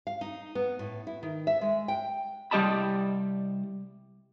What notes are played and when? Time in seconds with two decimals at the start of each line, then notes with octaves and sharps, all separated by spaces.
0.07 F5
0.21 D#4
0.55 B3
0.79 A2
1.07 E4
1.23 D#3
1.47 E5
1.61 G#3
1.88 G5
2.51 C2 G3 G4 D#5 A5 B5